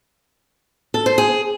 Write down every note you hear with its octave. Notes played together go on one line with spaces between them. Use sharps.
A4
C5
G#4